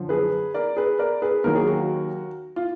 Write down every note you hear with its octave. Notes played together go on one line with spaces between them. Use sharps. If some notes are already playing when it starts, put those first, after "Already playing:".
Already playing: F#2 D3 F3
G#4 B4
A#4 D5
G#4 B4
A#4 D5
G#4 B4
D#2 D#3 F#3 A#4
G#4
F#4 A#4
F4